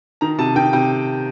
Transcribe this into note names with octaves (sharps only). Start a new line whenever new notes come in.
D#3 A#5
C3 A5
D#3 G5
C3 G5